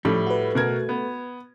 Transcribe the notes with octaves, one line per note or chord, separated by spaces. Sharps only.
A2 F3 G3 A3
F#4 B4
B2 A#4 G#6
B3